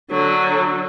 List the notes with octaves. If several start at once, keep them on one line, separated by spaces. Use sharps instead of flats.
D3 F#3